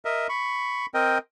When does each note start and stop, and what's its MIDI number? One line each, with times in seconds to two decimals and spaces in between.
0.05 0.27 70
0.05 0.27 75
0.05 0.27 76
0.29 0.86 83
0.29 0.86 85
0.94 1.18 60
0.94 1.18 70
0.94 1.18 75
0.94 1.18 79